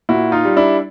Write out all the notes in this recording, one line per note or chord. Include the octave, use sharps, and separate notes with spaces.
A#2 E4 F#4
D#4 F4
G3
D4 E4